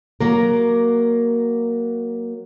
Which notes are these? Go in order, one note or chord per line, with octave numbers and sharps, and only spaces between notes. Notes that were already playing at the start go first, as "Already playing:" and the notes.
F#3 A#3 A#4